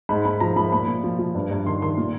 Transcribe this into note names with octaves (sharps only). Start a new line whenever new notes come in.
G#2 B5
G#2 B5
F3 A#5
F3 B5
A#2 B5
A#2
F3
F3
G2
G2
D#3 C6
D#3 C6
A#2